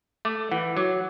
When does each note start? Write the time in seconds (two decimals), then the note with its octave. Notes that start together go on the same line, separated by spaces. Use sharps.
0.25 A3 D6
0.51 E3 F#5
0.77 F#3 D6